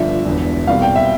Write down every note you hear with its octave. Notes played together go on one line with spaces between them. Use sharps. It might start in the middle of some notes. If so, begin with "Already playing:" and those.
Already playing: G1 G2 F3 E5
E1 E2 D3
C2 B2 G3 F5
G5
E5